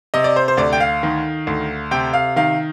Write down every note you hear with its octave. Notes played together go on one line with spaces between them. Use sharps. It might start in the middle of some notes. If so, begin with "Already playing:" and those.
C3 D#5
D5
C5
C5
D2 D5
G5
F5
D#3
D2
C3 G5
F5
D#3 F5